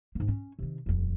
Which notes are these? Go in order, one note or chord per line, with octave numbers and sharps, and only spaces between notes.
G#2 A#3
C#4
C3 D#3
D#1 F2